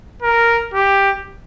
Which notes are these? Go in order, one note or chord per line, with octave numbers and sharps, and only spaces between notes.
A#4
G4